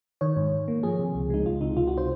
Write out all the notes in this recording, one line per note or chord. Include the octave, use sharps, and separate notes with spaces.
D#3 C#5
G#2
G#2
A#3
F3 G#4
C3
C#2
G#3 D#4
C#2 F4
C3 D#4
C3 F4
F#4
C5